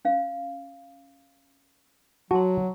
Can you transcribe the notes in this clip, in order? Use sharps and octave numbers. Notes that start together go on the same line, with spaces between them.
C#4 F5
F#3 F#4 A5 C6